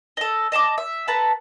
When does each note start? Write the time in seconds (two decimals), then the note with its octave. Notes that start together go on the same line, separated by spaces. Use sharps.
0.17 A4 D#5
0.52 D#5 A5 C6 D6
0.78 E5
1.07 A4 B4 A5 A#5